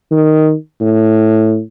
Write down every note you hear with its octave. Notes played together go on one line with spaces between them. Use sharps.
D#3
A2